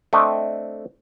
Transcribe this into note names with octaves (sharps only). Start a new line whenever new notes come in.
A3 C4 D4 D#5